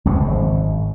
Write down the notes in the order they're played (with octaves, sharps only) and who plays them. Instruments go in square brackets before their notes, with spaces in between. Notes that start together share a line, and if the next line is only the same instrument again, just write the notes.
[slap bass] C#2 F#2 A2 C3
G#1